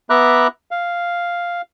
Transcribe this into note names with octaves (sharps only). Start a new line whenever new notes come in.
B3 E5 A#5 B5 D6 F#6
F5